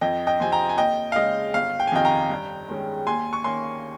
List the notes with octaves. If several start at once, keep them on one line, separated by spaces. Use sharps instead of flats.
F2 D#5 G5
D#5 G5
C3 F3 C4 G#5
G5 A#5
G#5
D#2 D#5 G5
F5
C#3 G#3 D#5
G1 F5
G5
G#5
F2 C3 D#3 D#5 G5
G5 A#5
G2
D#3 G#3 C#4
D#2 G#5 C6
C#6
D#3 A#3 C#4 G#5 C6